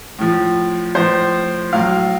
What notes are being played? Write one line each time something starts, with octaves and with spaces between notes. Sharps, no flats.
A2 F3
A2 F3 C5
A2 F#3 F5